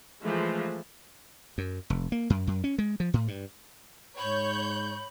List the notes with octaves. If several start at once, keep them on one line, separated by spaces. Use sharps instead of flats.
E3 F3 G#3 A3
F#2
F1
A#3
F#2
F#2
C#4
G#3
F3
A2
G2
G#2 C#5 B5 G6